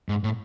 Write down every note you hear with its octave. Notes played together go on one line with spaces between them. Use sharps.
G#2
A2